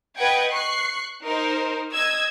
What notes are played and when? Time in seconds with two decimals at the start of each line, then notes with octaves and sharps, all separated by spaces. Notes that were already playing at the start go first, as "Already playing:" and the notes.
0.18 B4 D#5 F#5 G5 G#6
0.53 C#6 F#6 C7
1.25 D#4 A#4 C5
1.94 D#5 E6 G#6